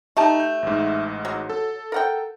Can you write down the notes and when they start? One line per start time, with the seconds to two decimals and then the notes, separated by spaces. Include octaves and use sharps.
0.17 A3 D#4 G4 A5
0.40 G6
0.63 A1 G#2
1.25 F#3
1.50 A4
1.92 A#4 F#5 G5